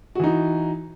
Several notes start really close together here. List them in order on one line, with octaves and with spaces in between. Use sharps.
F#4 E3 D#4